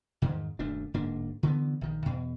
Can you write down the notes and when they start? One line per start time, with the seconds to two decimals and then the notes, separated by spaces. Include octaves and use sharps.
0.22 E2 G#2 D#3
0.59 D#1 F#2 A3 D4
0.94 D1 G#2 A#3 D4
1.43 D3 E3 G3 B3
1.81 A#1 D#3
2.06 E2 B2